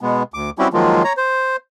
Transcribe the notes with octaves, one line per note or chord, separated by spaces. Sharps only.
B2 G#3 B3
D2 D6
G3 C4 C#4 E4 F#4 G4
D#3 F3 F#3 G#3 A#3 F4
C#5 A#5
C5